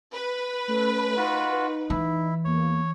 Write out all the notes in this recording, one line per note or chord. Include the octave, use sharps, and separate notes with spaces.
B4
A3 C#4 A4
D#4 F4 F#4
E3 E4
E2 A#3 C#5